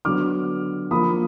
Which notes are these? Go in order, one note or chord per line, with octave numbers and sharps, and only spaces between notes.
D3 F#3 B3 D6 F6
D3 F3 A#3 B5 D#6